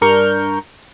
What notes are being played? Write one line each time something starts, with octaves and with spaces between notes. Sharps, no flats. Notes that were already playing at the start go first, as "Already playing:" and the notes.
G2 D4 A#4 C#6 F6 G6